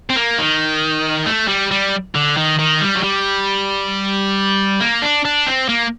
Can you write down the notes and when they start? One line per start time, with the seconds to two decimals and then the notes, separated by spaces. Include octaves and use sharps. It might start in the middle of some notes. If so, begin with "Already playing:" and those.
0.10 C4
0.16 A#3
0.38 D#3
1.26 A3
1.48 G3
1.71 G3
2.15 D3
2.37 D#3
2.59 D#3
2.81 G3
2.95 F#3
3.03 G3
4.80 A#3
5.02 D4
5.25 D4
5.46 C4
5.69 A#3